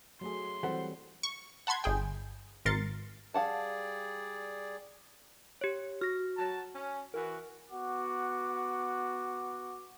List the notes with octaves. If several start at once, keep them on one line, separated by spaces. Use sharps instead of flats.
F#3 A3 G#4 C6
E3 F#3 G3 C4 A4 C5 F#5
C#6
F#5 A5 B5 C6 G#6
G1 G#4 G5
G#1 A#4 C6 A6 C#7
G3 G#4 D5 F5 F#5 A5
G4 C#5
F#4 F6 A#6
F#3 A5
C#4
E3 F#4 A#4
B3 F#4 F#5 D6